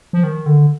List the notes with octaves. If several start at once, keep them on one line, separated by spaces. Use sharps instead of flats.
F3
D#3
D3